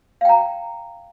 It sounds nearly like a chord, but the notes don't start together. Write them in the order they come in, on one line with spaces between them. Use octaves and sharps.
F5 G5 A#5